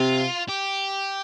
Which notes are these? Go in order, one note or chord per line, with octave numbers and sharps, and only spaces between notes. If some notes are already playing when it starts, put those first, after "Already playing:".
Already playing: C3 F4
G4